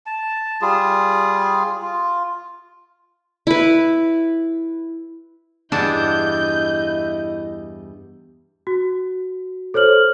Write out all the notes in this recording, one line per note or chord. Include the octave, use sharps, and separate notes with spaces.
A5
G3 F4 G#4
F4
E4 B4
E2 G2 D4 E4 D#5 F#5 A5 G6
F#4
A4 C5 C#5 F6 F#7